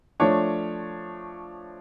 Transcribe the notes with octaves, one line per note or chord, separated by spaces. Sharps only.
F3 A3 D4 C#5